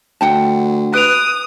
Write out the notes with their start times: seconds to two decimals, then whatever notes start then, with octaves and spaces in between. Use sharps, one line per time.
0.21 D2 F#5 G5 A5
0.94 B4 D#6 F#6 D7 F7